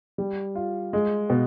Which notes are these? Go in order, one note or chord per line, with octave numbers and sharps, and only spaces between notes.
G3
F4
G#3
B2